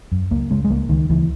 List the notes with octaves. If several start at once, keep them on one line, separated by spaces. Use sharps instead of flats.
F#2
C#2 A#3
C#3 G#3
G#3
C#2 A#3
C#2 D#3
C#2 E3